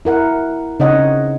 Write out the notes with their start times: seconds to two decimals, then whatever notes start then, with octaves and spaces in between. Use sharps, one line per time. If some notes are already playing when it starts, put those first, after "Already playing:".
0.05 E4 A#4 F#5
0.80 C#3 C4 D#4 C#5 D#5 F#5